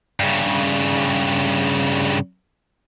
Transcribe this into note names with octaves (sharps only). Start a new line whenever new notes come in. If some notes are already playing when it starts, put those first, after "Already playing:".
G2 C#3